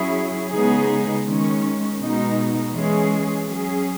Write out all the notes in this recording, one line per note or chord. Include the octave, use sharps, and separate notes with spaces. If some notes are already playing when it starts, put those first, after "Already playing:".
Already playing: F#3 C#4 E4 G#4
C#3 G#3 B3 D#4 G#4
D#3 G#3 C#4
B2 G#3 D#4
E3 G#3 C#4 G#4
F#3 C#4 G#4